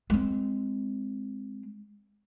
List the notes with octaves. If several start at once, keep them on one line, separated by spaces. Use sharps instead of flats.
G#3 C4